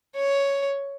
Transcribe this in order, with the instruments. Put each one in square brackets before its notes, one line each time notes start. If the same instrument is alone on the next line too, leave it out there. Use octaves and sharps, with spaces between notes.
[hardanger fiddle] C#5